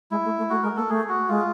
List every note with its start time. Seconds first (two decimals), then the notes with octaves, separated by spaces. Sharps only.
0.11 G#3 E4
0.25 A3
0.38 A3
0.50 A3 F#4
0.63 G#3 A#4
0.77 A#3 A4
0.89 A3 G#4
1.09 F#4
1.29 G#3 F4